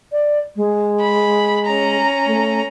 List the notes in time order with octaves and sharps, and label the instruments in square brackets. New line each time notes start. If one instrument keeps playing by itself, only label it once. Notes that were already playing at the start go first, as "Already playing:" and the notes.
[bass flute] D5
G#3
[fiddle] B5
C#4 A#5
[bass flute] A3